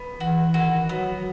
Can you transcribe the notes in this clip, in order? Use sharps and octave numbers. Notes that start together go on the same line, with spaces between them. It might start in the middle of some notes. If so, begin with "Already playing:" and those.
Already playing: B3
E3 F#4
D#3 F#4
F#3 B3